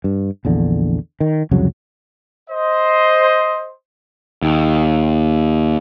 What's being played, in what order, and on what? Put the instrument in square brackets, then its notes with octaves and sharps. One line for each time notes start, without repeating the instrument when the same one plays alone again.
[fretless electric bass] G2
A#1 E2 D3
D#3
C2 F2 C#3 F#3
[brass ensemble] C5 D#5
[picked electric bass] D#2